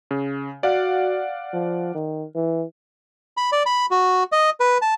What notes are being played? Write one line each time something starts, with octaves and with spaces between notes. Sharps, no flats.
C#3
F#4 D5 F5 F#5
F3
D#3
E3
B5
D5
B5
F#4
D#5
B4
A5